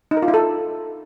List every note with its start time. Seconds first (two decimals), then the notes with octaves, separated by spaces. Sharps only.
0.11 D#4
0.17 A#4
0.22 F4
0.28 E4
0.34 A4